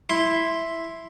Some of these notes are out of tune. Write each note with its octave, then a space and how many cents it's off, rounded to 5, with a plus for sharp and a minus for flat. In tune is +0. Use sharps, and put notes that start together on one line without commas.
E4 +0 C6 +0